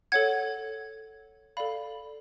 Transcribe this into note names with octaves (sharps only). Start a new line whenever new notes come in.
A4 C#5 F#5 G#6
A4 D5 F5 B5